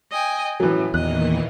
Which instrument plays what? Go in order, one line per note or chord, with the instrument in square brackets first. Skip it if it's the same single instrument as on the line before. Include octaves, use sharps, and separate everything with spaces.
[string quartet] D#5 G5 G#5
[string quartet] A2 [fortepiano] E3 F#3
[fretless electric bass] E2 [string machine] A#2 D#3 E3 [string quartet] D#5 [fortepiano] F#6